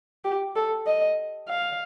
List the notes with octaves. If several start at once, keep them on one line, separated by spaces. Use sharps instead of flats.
G4
A4
D#5
F5